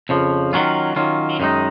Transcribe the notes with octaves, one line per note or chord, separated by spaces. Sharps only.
F2 C#3 F3
D#3 F#3 C#4 F4
D#3 F#3 C#4 F4
F#2 D#3 G#3 D#4